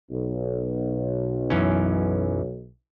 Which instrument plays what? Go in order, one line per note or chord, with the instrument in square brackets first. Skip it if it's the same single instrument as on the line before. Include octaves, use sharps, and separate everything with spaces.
[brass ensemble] B1
[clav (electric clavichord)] F#2 E3 C#4